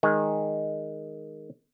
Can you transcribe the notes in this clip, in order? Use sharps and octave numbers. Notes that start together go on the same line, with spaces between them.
D#3 G#3